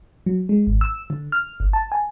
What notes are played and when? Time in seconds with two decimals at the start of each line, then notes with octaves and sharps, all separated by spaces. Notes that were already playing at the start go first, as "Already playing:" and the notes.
0.26 F#3
0.49 G#3
0.67 G#1
0.81 E6
1.10 D3
1.32 F6
1.60 G1
1.73 A5
1.92 G#5